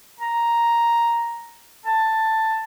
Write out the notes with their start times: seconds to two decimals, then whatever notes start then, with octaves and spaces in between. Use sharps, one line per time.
0.20 A#5
1.86 A5